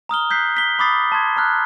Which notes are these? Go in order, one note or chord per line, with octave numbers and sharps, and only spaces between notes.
A#5 D#6 F6 G7
F#6 G6 B6 C7
B6 G7
B5 D6 D#6 A6 C7
A5 C6 G#6
A5 A#5 F6 F#6